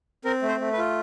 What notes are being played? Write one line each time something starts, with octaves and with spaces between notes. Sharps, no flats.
C4 A#4
A3
C5
A3
B4
F4